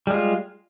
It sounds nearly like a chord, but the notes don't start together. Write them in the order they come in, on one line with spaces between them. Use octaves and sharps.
G3 G#3 F4